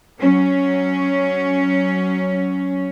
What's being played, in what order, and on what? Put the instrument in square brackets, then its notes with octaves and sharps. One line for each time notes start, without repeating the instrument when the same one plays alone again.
[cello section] F#3 C#4